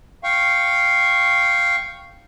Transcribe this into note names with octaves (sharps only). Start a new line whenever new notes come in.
F5 G5 C#6